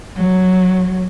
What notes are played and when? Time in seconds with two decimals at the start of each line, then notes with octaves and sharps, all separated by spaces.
0.17 F#3